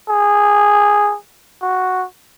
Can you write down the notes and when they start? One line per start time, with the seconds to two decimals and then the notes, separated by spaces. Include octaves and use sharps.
0.09 G#4
1.62 F#4